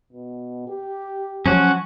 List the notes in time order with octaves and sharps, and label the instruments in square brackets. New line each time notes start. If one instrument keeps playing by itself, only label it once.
[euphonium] B2
G4
[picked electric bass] F3 F#3 [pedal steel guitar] C#4 F#4